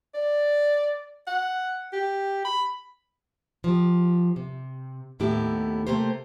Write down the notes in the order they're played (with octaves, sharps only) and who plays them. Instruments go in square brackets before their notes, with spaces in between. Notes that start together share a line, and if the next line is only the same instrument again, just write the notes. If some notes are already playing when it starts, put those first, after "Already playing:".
[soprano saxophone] D5
F#5
G4
B5
[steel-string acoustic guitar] F3 G4
C3
D#2 A2 B3 E4 G4
C3 A3 A#3 G4 C5